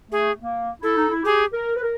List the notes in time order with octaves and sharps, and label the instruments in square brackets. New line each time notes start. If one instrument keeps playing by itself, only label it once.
[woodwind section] A3 [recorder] G#4
[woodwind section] A#3
[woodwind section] E4 [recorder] A4
[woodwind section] D#4
E4
[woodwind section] G4 [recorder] G#4
[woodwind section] A#4
B4
A#4